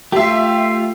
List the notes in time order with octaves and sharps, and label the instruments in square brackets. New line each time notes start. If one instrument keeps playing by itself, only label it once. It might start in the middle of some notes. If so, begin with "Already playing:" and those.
[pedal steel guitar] A3 F4 [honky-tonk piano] G4 E5